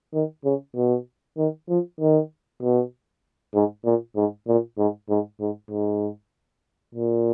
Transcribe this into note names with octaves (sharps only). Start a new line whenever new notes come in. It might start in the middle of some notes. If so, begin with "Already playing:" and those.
D#3
C#3
B2
D#3
F3
D#3
B2
G#2
A#2
G#2
A#2
G#2
G#2
G#2
G#2
A#2